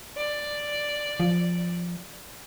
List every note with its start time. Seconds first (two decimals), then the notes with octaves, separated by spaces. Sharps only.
0.17 D5
1.20 F3